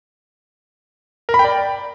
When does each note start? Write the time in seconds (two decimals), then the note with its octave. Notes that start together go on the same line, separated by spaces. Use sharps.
1.29 A#4
1.34 B5
1.39 G5
1.44 D5